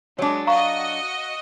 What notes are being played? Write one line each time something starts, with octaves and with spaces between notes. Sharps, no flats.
F#3 G#3 D4 C#5
F#4 D#5 F5 A#5 C#6